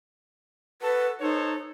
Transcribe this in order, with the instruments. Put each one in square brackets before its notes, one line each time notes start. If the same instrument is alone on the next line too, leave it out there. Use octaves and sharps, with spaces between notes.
[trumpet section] F#4 A4 A5 [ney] B4
[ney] D#4 [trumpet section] A4 C5 C#5